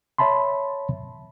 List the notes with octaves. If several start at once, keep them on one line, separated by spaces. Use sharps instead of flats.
C#5 E5 A5 B5 C6